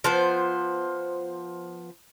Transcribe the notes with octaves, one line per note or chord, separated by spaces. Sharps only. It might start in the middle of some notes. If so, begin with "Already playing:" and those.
F3 B3 C5